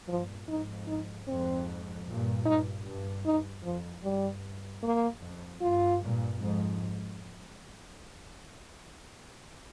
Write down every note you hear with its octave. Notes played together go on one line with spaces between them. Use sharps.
G2 A#2 F3
F2 G#2 D#4
D#4
F2 G#2 C4
G2 A#2
G2 D#4
G2
G2 D#4
F2 F3
G2 G3
A#3
F2
G2 F4
G2 A#2
F2 G#2